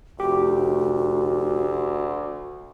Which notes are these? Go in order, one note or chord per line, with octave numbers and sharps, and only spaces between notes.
F1 D2 F#4 G4